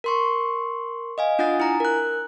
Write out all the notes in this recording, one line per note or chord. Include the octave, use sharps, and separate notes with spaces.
A#4 C6 C#6
D#5 F5 G#5
D4 F4 F#5 D#6 A6
E4 G#5 A#5
A#4 F#6